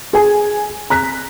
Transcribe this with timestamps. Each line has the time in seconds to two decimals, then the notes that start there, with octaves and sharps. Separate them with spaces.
0.13 G#4 G#5
0.90 A#5 F#6 B6